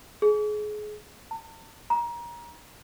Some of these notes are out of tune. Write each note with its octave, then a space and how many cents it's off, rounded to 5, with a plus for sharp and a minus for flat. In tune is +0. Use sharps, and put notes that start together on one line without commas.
G#4 +25
A5 +45
A#5 +25